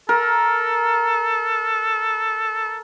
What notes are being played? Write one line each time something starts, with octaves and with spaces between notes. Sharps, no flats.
A4 A#4